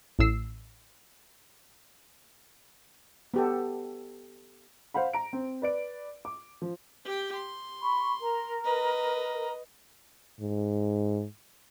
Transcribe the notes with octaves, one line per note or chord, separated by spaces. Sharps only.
A1 A2 E6 C7
B3 G4 A4
C5 F5 F#5 B5
A#5 D7
C4
B4 D5 D7
D6
F3
G4 G5
C6
B5 C#6
A#4 A#5
B4 D#5
G#2